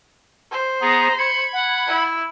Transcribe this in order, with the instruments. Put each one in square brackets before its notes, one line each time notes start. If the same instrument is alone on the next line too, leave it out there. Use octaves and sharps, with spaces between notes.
[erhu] C5
[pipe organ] B3 G#4 [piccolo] A#5
[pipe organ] B5 G#6 [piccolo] C#7
[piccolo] F#5
[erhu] E4